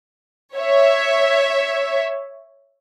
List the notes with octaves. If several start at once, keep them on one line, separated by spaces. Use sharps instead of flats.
C#5 E5